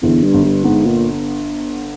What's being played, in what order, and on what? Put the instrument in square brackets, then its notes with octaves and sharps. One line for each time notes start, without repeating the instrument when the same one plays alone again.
[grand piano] G1 [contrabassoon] E2
[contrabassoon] G2
[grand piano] G1
[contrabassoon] G2
[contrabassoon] G#2 [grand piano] B3
[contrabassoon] A#2